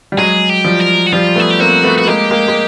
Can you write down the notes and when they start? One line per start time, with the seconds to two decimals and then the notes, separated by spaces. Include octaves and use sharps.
0.12 G3
0.17 F#3 G#3 G#4
0.49 G4
0.65 F3 G3
0.81 A#4
1.06 F#4
1.12 F3 G3 F4
1.36 A3 B3 G#4
1.50 G4
1.59 A#3 C4 F#4
1.84 A3 B3
1.98 B3 F#4
2.07 G#3 A#3 G4
2.31 G#3 A#3
2.48 G#3